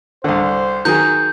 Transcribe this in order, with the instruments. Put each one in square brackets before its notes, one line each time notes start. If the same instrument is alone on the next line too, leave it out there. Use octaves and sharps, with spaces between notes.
[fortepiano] C2 D3 [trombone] C5
[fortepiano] D#3 F#3 G#4 [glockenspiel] G6